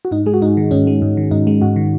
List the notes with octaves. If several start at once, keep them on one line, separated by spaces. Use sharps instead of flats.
F#4
G#2 D#4
G#3 G#4
F#4
G#2 D#4
D#3
G#2 C#4
G#3
G#2
D#3
G#2 D#4
G#3
G#2 F#4
D#3